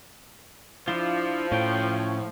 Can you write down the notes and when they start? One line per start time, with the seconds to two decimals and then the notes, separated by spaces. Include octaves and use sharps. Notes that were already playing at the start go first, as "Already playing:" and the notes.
0.88 F3 D4 E4 F4
1.52 A2 C#4 G5